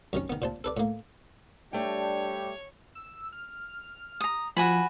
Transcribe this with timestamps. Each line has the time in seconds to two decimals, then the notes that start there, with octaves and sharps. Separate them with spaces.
0.13 F#2 D#3 C#4
0.30 D#3 B3
0.42 A#2 C5 A5
0.64 A4 B4 D5
0.77 A2 A#3
1.73 G3 A3 D4 G4 C#5 G5
2.95 E6
3.32 F6
4.21 A#5 D#6
4.57 F3 F#4 G#5 B5